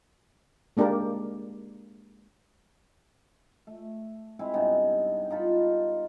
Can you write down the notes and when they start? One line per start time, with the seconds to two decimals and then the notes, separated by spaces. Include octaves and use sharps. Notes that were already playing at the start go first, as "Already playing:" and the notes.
0.77 G#3 A#3 D4 G4 A#4
3.67 A3
4.39 G#3 C4 E4
4.54 G2 C3 B3 D#4
5.30 D#4 F4 A4 B5